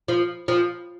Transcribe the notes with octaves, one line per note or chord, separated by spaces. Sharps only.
F3
F3